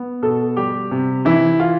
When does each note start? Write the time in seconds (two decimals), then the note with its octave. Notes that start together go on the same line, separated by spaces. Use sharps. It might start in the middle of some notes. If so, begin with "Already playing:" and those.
Already playing: B3
0.22 B2 A4
0.57 G3 G4
0.91 C3
1.25 E3 E4
1.60 F4